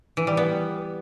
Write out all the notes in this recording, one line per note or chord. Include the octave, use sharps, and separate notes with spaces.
E3
G3
B3